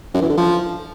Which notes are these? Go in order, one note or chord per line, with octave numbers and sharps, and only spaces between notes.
F#2
E3
D3
F3